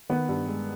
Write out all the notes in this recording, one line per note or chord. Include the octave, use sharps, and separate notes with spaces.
D#3 B3
G2
G#3